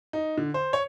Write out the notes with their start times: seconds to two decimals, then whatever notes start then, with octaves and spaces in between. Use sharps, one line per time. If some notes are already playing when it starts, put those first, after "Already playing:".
0.13 D#4
0.38 D3
0.54 C5
0.73 C#5